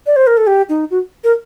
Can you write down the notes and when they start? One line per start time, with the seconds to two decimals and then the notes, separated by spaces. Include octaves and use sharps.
0.06 D5
0.16 C5
0.27 A#4
0.37 A4
0.47 G4
0.69 D#4
0.91 F#4
1.24 A#4